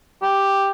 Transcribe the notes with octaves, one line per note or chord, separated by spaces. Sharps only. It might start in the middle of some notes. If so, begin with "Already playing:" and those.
G4